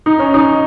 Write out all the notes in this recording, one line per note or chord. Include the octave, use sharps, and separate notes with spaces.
D#4
C#4
D#4